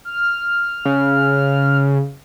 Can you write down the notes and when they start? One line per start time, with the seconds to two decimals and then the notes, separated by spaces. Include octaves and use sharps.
0.05 F6
0.85 C#3